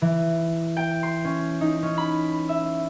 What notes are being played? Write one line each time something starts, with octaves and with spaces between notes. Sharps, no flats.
E3
G5
C6
C#4
D#4
C#4
B5
E5